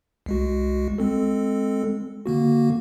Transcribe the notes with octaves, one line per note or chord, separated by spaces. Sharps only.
C2 G#3 F#4
G#3 C4 A4
D3 A#3 F#4